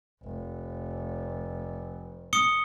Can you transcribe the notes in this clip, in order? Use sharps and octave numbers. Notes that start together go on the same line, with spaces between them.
F1
D#6 C#7 G7